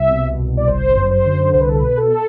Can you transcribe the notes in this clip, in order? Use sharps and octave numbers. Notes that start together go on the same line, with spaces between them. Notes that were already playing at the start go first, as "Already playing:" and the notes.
Already playing: C2 E5
B2
C2
D5
G1 C5
F#2
C5
D3
C2 C5
B4
A4
B4
B2
A4